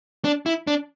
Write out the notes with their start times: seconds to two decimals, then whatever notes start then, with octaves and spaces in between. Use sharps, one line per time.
0.24 D4
0.46 E4
0.67 D4